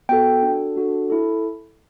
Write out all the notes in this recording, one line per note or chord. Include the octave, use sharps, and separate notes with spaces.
B3 F#4 A4 G5
D4 F#4 A4
D4 F#4 A4
E4 A4